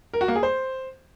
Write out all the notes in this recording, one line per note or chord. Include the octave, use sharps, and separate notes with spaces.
A#4
F#4
A#3
G#4
C5